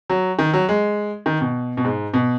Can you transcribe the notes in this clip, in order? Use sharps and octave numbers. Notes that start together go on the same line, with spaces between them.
F#3
D#3
F#3
G#3
D#3
B2
B2
G#2
B2